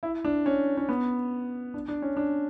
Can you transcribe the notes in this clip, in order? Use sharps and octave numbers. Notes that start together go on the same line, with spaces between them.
E4
D4
C#4
C#4
B3
D4
D4
C#4
D4